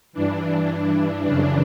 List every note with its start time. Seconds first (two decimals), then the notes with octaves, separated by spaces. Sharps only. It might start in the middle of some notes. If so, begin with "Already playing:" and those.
0.13 G2 E3 D4
1.26 F#2 C#3 E3 D4